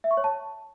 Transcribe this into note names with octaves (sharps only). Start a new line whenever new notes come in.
E5
C#6
C#5
A5